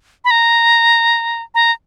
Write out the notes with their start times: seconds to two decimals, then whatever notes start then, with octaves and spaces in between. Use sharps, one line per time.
0.25 B5
0.31 A#5
1.55 A#5